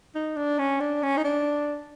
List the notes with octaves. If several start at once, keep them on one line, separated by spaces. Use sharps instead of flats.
D#4
D4
C#4
D4
C#4
D#4
D4